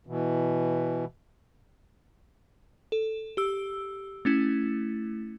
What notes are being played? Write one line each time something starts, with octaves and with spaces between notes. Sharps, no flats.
B2 E3
A4
G4 E6
A3 C#4 E4